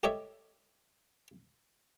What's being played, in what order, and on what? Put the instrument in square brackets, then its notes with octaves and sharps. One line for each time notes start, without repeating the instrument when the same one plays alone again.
[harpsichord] G4 A4 C#5 D#5 E5